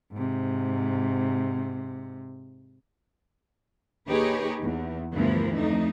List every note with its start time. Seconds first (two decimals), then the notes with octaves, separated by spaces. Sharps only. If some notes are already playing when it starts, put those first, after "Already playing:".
0.12 G#2 C3
4.08 D#2 D#4 G4 G#4 B4 C#5
4.62 E2
5.12 D2 G2 E3 F3 B3 A#4
5.54 F2 A3 D4 D#4